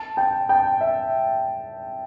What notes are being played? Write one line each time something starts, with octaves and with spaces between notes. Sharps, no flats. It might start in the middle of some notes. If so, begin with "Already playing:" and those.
Already playing: A5
G5
G5
E5